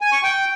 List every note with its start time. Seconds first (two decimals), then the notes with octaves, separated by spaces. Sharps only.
0.01 G#5
0.12 C#6
0.23 G5